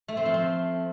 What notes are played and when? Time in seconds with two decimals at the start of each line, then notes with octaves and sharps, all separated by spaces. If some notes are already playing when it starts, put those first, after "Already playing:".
0.08 A3
0.17 C4
0.25 F3
0.34 C4